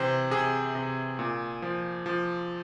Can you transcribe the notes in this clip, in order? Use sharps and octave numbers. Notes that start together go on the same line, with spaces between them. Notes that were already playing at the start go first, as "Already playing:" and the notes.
Already playing: C3 E3 C5
C3 G#4
C3
A#2
F3
F3